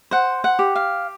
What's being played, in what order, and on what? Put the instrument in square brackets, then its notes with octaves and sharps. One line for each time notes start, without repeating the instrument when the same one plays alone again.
[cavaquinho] C5 F#5
F#5
G4
F5